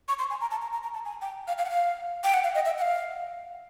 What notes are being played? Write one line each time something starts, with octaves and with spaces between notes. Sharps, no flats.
C#6
C6
G#5
A#5
A5
A#5
A#5
A#5
A5
G#5
G5
F5
F5
F#5
F5
G5
F#5
F5
D#5
E5
F#5
F5